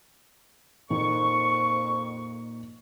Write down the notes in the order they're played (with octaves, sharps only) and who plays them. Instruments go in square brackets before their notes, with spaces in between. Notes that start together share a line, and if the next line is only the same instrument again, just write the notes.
[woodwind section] F2 C#6 [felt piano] A#2 A#3 D#4